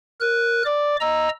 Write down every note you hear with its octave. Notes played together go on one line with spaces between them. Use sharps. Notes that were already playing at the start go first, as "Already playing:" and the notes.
A#4 F#6
D5 D6
D#5 A#5 E6